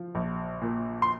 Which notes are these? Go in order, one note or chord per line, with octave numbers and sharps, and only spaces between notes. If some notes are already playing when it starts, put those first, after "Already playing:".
Already playing: F3
A#1
A#2
C6